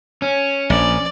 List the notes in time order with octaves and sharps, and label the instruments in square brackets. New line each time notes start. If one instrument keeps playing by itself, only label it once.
[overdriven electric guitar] C#4
[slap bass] A#1 [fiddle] D5